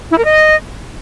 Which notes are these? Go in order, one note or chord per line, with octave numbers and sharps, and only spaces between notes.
E4
A#4
D#5